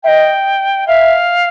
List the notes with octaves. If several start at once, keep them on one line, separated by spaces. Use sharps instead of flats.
D#5 E5 G5
E5 F5